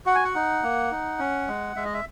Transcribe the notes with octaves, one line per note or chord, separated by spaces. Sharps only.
F#4 F#5
G#5
F#5
D#4
A#3
D#4
C#4
G#3
G#3 E5
D#5
E5